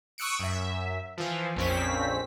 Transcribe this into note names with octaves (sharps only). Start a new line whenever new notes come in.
C#6 D#6 E6 F#6 C#7 D7
F#2 E5
E3 F3
A#1 F2 C4 C#4 B6